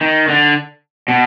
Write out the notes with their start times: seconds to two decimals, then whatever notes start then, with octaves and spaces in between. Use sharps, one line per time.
0.01 D#3
0.28 D3
1.08 B2